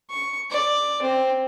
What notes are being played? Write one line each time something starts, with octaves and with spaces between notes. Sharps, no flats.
C#6
D5
C4